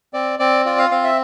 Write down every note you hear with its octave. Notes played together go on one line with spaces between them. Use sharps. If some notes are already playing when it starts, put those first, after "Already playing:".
C4 D5
C4 D5
F4 D5
F5
C4 F5
E5